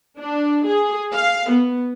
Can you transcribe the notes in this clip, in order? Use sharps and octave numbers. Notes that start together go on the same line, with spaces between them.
D4
G#4
F5
B3